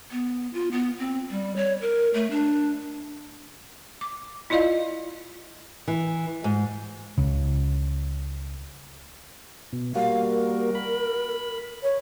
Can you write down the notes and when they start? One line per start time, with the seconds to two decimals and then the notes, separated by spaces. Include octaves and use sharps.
0.11 B3
0.54 F4
0.72 B3
0.99 C4
1.30 G3
1.56 C#5
1.81 A#4
2.14 A3
2.31 D4
4.01 D6
4.50 E4 F4 D5 D#5 F5
5.88 E3
6.44 G#2
7.18 C#2 C#3
9.73 B2
9.95 G3 A#3 F#4 F5
10.31 A#4
10.75 B5
11.83 C#5